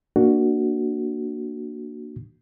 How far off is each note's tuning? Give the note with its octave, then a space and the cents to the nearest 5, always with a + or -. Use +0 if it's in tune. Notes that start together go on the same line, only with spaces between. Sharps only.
A#3 +0 D4 +15 F#4 +0